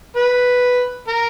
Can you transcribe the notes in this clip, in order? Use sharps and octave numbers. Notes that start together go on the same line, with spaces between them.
B4
A#4